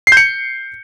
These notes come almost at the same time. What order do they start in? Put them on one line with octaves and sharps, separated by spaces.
C7 G6 C#7